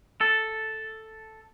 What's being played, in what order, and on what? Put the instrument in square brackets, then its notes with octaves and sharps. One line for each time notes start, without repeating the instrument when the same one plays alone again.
[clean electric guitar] A4